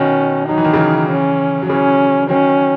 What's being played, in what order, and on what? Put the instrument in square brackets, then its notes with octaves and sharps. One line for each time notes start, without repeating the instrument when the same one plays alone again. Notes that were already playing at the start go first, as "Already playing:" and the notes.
Already playing: [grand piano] B2 D#3 [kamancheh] C#4
[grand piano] F#3 [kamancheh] D#4
[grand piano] E3
D#3
C#3 E3
[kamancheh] C#4
[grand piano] F#3
[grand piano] C#3 E3 [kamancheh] C#4
[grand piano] D#3 F#3 [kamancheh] C#4